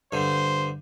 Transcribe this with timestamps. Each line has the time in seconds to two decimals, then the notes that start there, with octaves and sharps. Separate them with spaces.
0.13 G2 D3 C5